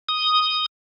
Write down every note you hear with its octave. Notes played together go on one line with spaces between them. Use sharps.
D#6